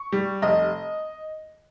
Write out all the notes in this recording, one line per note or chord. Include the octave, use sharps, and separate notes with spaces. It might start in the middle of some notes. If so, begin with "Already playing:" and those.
Already playing: C#6
G3
F1 D#5